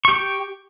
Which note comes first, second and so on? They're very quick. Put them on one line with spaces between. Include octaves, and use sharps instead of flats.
C#6 G4 G5